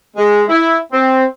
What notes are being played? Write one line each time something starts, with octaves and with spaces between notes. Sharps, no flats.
G#3
E4
C4